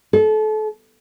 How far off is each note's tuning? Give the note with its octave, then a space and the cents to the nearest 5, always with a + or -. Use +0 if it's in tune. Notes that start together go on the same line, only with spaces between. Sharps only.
A4 -30